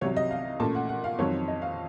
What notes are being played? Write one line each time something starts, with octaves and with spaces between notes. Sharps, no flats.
C2 C3 F#3 C#5
D#5
F5
A#2 A3 C#4 A5
F#5
F#5
F5
F2 D#3 F#3 C4 C#5
D#5
F5